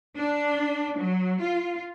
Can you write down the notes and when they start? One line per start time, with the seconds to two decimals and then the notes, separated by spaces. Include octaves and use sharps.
0.18 D4
1.01 F#3
1.41 F4